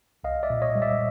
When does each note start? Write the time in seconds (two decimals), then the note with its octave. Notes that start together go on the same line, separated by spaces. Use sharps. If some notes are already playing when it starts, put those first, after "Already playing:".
0.24 C2 D#5 F5
0.43 D5 E5
0.50 A#2
0.62 C#5 D#5
0.75 G3
0.82 D5 E5